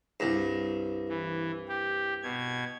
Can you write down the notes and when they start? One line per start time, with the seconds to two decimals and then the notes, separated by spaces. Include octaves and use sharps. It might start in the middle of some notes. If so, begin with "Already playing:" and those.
0.20 C2 G2
1.09 E3
1.68 G4
2.23 B2 G#6